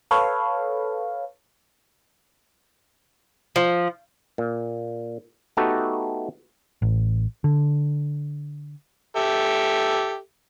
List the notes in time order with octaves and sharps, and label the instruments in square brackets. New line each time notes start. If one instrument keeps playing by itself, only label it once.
[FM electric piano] A4 B4 C#5 F5
[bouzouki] F3
[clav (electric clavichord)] A#2
A3 B3 D#4 F#4 G4 A4
[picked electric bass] A1
D3
[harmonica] G4 A4 E5